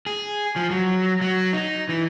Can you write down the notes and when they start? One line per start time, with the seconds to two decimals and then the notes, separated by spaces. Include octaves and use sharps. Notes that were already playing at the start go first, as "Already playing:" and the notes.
0.06 G#4
0.56 F3
0.71 F#3
1.21 F#3
1.53 D#4
1.89 E3